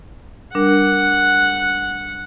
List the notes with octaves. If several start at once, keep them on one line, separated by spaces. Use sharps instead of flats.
G3 D4 A#4 F#5